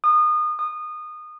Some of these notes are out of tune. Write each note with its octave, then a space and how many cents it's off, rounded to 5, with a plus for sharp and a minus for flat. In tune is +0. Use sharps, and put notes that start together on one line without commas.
D#6 -30
D#6 -25